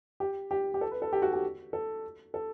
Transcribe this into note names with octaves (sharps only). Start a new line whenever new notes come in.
G4
G4
G4
A4
B4
A4
G4
F#4
G4
A4
A4